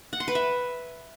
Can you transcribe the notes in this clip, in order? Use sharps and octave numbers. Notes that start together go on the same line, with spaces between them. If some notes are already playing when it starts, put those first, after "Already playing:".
F#5
C6
B4
E5